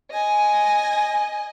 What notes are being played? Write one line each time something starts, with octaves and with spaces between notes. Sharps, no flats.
D#5 G#5